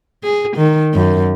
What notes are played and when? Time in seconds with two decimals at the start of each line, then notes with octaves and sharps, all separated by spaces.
0.24 G#4
0.57 D#3
0.94 F#2